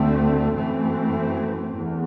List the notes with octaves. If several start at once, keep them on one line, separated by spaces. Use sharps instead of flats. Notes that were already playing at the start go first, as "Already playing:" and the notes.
Already playing: D2 D3 A3 C4
F#2 E3 A3 C4
E2